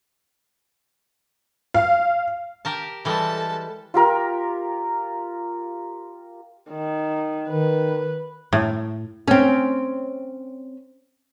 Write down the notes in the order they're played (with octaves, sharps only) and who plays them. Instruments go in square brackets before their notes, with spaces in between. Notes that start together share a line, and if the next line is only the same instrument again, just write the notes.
[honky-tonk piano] F5
[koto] G4 A#4 A5
[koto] E3 G3 G#3 [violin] A4 A5
[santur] F4 G4 A#4
[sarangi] D#3
[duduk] D#3 [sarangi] B4
[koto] A2
[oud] C4 C#4